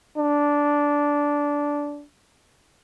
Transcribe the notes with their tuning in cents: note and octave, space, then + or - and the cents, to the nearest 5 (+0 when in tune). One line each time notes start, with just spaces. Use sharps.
D4 -10